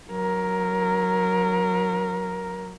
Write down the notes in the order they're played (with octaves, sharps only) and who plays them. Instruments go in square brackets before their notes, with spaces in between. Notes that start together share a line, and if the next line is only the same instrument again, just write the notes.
[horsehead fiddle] F#3 A#4